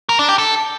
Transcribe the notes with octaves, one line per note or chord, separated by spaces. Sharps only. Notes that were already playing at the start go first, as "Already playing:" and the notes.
A#4
D4
G4
A4